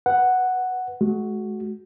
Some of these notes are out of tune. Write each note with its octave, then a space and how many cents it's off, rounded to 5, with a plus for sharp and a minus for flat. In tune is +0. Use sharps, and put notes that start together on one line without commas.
B4 +0 F#5 +0
G#3 +45 F#4 +0